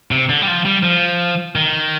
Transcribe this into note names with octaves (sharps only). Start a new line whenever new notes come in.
C3
D3
G3
F3
G3
F3
D#3